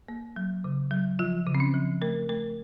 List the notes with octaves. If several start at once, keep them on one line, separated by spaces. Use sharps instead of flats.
A#3
F#3
C#3
F#3
F3 F4
C#3
C4
C#4
F3
A3 A#4
A3 A#4